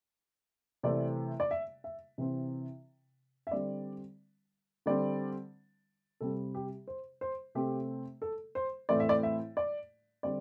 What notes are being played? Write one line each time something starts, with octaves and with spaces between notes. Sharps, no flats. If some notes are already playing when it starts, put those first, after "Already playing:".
C3 E3 A3 C4 D5
D5
E5
E5
C3 E3 C4
E5
D3 G3 C4 D5
D3 G3 C4 D5
C3 G3 C4 A4
G4
C5
C5
C3 A3 C4 G4
A4
C5
A2 E3 A3 C4 D5
E5
D5
E5
D5
D3 G3 C4 D5